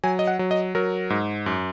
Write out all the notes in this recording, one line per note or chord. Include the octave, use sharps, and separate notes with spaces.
F#3 G#5
D#5
F#5
F#3
D#5
F#3 A#4
G#2
F#2